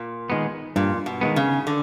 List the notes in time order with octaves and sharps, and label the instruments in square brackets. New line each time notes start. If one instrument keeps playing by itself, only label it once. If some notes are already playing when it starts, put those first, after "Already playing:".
Already playing: [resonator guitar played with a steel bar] A#2
[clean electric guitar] D#3 G#3 B3
[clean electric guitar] G2 [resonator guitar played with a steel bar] A#2
[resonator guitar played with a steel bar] B2
[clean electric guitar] D#3 G#3 B3
[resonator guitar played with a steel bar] C#3
D3